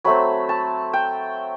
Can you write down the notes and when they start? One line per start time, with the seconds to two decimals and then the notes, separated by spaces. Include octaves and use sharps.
0.04 F#3 A3 C4 B5
0.49 A5
0.93 G5